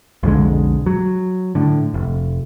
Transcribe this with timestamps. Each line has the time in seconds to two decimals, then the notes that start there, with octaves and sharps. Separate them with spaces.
0.23 B1 F2 D3 G#3
0.86 F#3
1.55 A2 D3
1.94 F1